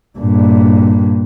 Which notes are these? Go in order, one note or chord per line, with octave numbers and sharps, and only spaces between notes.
G2 A#2